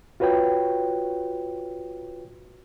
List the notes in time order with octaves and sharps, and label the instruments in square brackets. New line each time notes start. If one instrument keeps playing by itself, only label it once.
[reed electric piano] F4 F#4 B4 C#5 G5